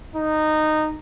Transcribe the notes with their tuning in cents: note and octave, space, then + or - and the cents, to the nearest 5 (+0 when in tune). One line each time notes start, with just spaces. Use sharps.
D#4 -15